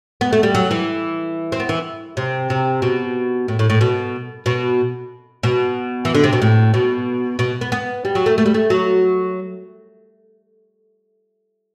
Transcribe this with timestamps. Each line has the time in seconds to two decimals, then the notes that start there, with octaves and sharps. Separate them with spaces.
0.21 B3
0.33 A3
0.43 G3
0.55 F#3
0.71 E3
1.52 C4
1.60 B3
1.69 E3
2.17 C3
2.50 C3
2.82 B2
3.48 A2
3.59 A2
3.70 A2
3.81 B2
4.46 B2
5.43 B2
6.05 E3
6.14 D3
6.24 C3
6.33 B2
6.42 A2
6.74 B2
7.39 B2
7.61 B3
7.72 B3
8.05 G3
8.15 F#3
8.26 A3
8.38 A3
8.46 G3
8.54 A3
8.70 F#3